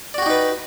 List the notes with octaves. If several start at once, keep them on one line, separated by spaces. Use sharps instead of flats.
D#4 F#4 G4 B4 D5